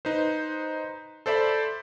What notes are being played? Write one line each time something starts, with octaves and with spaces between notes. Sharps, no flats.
D#4 B4 C5
A4 C5 D5 E5 B5